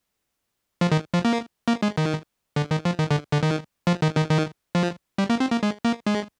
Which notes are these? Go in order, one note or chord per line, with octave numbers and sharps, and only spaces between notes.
F3
D#3
F3
A#3
A#3
G#3
D#3
D3
D#3
F3
D#3
D3
D3
D#3
F3
D#3
D#3
D#3
F3
G3
A#3
C4
A#3
G#3
A#3
G#3